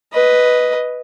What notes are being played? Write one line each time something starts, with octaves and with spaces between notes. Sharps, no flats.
B4 D#5